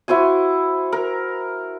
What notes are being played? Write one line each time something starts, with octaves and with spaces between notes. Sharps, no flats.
E4 F#4 C5 G#5
A#4